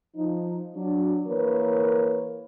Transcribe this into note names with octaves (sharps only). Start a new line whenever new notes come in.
F3 D#4
F#3 D4
E3 A#3 A#4 B4 C#5